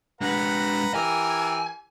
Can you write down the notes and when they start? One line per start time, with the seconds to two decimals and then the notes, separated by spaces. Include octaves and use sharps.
0.21 G#3 D4 B4 F#5 A#5
0.94 E3 G4 A#4 G#5